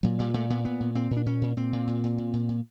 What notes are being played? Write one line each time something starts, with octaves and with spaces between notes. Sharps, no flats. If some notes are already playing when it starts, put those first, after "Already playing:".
A#2 F#3
A#2 G3
A#2 A3
A#2 B3
A#2 B3
A#2
A#2 C4
A#2
D4
A#2 C#4
A#2
A#2 C4
A#2
A#2
A#2
A#2
A#2
A#2